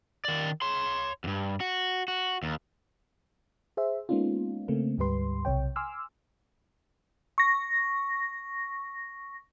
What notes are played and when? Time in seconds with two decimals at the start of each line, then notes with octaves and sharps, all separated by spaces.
0.25 D#3 D5
0.62 C#5 C6
1.24 E2 G2
1.60 F#4
2.08 F#4
2.43 D#2
3.77 G#4 C5 E5
4.09 G#3 A#3 B3 C#4 D#4 F4
4.68 C#3 A3 A#3 C4
4.98 D2 G#2 G3 G4 B4 C6
5.45 B1 C3 C#5 G5
5.76 G#5 C6 D6 E6 F6
7.38 C#6 A#6